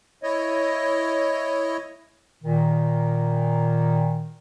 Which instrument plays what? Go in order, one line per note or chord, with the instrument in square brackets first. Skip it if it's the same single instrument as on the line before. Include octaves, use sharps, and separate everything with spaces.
[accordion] E4 C#5 D#5
[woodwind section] A#2 D#3